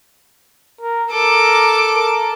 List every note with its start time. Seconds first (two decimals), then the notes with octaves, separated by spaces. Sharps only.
0.81 A#4
1.11 A4 A#4 D6
1.95 A#4